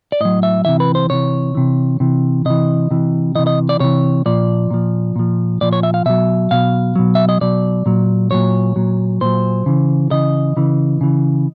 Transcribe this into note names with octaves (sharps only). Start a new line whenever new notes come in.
D5
A2 F#3 D#5
E5
C3 E3 E5
B4
C5
C3 E3 C#5
C3 E3
C3 E3
C3 E3 D#5
C3 E3
C3 E3 D#5
D#5
D5
C3 E3 C#5
A#2 F3 D5
A#2 F3
A#2 F3
A#2 F3 D5
C#5
E5
F5
B2 F#3 E5
B2 F#3 F5
B2 F#3
E5
D#5
B2 F#3 D5
A#2 F#3
A#2 F#3 C#5
A#2 F#3
A#2 F#3 C5
C#3 E3
C#3 E3 D#5
C#3 E3
C#3 E3